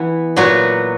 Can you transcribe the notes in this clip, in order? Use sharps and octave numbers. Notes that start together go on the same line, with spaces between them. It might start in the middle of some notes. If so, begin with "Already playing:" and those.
Already playing: E3 B3 E4
A#2 F#3 B3 F#4